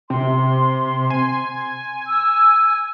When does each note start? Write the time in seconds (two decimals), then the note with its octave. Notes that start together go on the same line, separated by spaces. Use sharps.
0.10 C3 C6
1.10 G#5
2.08 E6